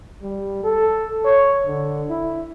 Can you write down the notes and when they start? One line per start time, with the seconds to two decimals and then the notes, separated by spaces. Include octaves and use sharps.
0.22 G3
0.64 A4
1.25 C#5
1.66 D3
2.10 E4